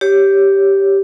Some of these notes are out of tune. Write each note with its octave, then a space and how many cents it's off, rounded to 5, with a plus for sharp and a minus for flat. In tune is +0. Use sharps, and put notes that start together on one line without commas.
G4 +0 C#5 +0